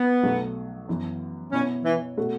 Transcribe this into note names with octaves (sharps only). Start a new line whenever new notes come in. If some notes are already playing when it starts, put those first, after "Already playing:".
Already playing: B3
B1 B2 F#3 A3
F#2 E3 B3
B2 B3 C#4 E4 C#5
E3
B2 A3 F#4 A4